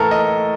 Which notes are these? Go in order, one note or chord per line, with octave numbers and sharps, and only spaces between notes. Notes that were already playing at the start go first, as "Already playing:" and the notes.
Already playing: A2 E3 A4 A#4
D#5